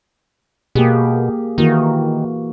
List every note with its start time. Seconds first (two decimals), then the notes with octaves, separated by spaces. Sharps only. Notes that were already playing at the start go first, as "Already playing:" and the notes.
0.75 B2 A#3 G4 G#4
1.58 D#3 E3 A#3 F#4